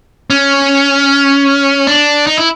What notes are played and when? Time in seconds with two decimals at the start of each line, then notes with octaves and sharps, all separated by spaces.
0.30 C#4
1.87 D4
2.27 D#4
2.37 E4